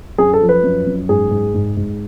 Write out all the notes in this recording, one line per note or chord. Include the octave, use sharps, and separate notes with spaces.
F#2 G#4
A4
F3
B4
F#2
F#2
G#2 G#4
G#2
G#2
G#2